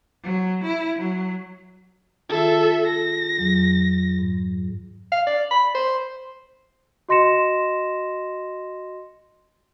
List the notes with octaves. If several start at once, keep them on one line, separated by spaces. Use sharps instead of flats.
F#3
E4
F#3
D#3 F4 G#4 A4 E5
A#6
F2 F#3 G#4
G#2
F5
D5
B5
C5
F#4 D#5 C6 A#6 C#7 E7